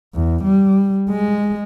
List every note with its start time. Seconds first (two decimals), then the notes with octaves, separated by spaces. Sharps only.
0.15 E2
0.44 G3
1.09 G#3